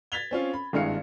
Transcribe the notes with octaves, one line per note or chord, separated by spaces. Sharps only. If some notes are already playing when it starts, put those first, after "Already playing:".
G#6 A6 B6 F7 G7
C4 C#4 F4
B5
G#1 G2 G#3 E4 F5 C#7